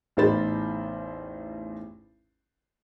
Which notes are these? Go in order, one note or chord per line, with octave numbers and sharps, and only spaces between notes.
A1 E2 D#4 C5 B5 A6